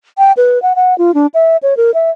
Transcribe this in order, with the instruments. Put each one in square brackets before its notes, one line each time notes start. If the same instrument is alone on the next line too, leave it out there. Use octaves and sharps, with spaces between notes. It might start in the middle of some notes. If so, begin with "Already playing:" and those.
[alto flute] G5
B4
F#5
F#5
F4
D4
E5
C#5
A#4
E5